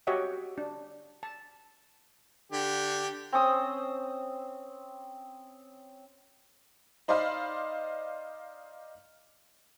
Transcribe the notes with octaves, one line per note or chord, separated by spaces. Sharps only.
F#4 G4 C#5 D#5 E5 F#5
D4
A5
D3 G4
C4 C#4 D#6 E6
D#4 C5 D5 D#5 F5 B5